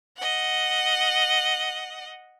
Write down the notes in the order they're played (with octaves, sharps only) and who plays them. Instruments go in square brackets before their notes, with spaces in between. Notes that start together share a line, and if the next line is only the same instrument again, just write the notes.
[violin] D#5 F#5